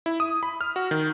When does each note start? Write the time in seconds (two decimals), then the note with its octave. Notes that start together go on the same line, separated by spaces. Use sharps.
0.06 E4
0.20 D#6
0.43 B5
0.61 F6
0.76 F#4
0.91 D#3